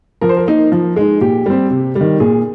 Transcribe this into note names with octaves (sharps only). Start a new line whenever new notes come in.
F3 A#4
C5
A#4
A#3 D#4
F3
G#3 D#4
A#2 G4
G3 C4
C3
G3
D#3
A#2 G#4